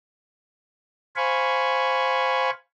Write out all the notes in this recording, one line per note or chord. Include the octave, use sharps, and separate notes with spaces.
C5 F5 G#5 B5 C#6